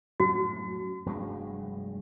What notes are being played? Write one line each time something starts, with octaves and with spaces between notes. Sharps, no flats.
F#2 A2 F#3 F#4
F1 G2 G#3